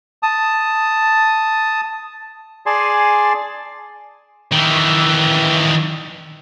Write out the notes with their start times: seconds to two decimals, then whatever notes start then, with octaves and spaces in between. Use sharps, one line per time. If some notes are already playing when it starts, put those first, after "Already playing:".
0.23 A5 D#6
2.66 G#4 D5 G#5 A5 C6
4.52 D#3 E3